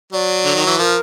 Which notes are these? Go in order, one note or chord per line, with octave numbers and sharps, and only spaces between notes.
F#3 D5
D3
D#3
E3
F3 A#4